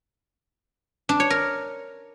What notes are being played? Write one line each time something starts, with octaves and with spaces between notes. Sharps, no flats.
D4
C#5
A#4